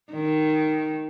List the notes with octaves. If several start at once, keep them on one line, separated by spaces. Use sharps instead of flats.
D#3